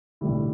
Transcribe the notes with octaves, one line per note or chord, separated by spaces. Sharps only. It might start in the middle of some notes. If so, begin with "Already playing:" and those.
B1 A2 D3 G3 E4